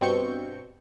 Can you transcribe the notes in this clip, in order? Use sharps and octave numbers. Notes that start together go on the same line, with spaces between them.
G2 B2 C4 C#6 G6 C#7